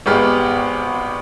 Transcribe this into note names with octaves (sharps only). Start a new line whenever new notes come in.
G#1 G#3 B3 G4 F6